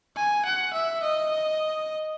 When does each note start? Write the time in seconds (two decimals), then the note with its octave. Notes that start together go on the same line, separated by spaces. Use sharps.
0.17 G#5
0.45 F#5
0.74 E5
1.03 D#5